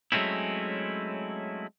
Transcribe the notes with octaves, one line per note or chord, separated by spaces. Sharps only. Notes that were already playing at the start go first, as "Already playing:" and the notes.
F#3 G#3 A3 C4 C#4 E4